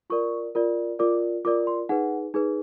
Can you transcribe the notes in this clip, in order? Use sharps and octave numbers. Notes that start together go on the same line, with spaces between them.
F4 A#4 D5 C#6
F4 A#4 D5
F4 A#4 D5 D6
F4 A#4 D5 D6
C6
D#4 G#4 B4 F#5
D#4 G#4 B4